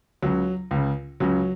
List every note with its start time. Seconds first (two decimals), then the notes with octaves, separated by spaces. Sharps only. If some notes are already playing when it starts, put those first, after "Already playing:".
0.22 C#2 C#3 F#3
0.71 C#2 C#3
1.20 C#2 C#3 F#3